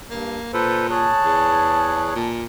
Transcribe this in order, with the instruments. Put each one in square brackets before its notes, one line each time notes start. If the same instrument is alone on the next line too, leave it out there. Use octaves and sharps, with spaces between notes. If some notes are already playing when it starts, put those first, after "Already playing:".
[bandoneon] G2 [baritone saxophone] A#3
[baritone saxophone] A#2 [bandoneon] A4 B4 C5
[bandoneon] G#4 C#5 F#6 [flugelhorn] A5
[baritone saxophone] E2
A#2